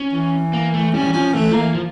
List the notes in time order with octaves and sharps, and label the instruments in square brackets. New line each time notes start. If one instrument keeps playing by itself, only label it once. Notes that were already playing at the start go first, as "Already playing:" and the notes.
Already playing: [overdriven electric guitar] C#4
[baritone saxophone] E3
[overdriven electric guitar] A#3
A3
[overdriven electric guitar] G3 [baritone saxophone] C#4
[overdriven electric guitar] E3
[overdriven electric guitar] F3 [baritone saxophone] C#4
[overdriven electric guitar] E3 [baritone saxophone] A3
[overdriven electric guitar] F3
[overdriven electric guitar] E3 [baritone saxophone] A#3
[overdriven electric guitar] F3